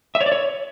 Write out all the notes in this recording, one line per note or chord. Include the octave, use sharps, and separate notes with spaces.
E5
C#5
D5
C#5